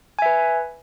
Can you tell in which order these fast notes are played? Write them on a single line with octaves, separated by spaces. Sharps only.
G#5 E5 B4